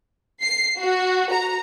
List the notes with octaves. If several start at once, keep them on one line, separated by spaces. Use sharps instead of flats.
C7
F#4
A#5